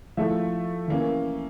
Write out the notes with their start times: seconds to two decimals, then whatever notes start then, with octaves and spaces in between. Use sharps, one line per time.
0.17 F3 A3 E4 E5
0.88 E3 A#3 C#4